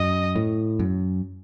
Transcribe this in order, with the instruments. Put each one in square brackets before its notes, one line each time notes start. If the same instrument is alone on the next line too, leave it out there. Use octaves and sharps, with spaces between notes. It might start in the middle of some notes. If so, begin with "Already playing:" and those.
Already playing: [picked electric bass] F#2 [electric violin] D#5
[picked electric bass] A2
F#2